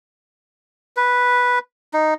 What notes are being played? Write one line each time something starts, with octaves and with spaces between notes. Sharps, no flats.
B4
D#4